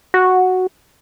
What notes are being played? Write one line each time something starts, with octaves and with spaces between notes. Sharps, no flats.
F#4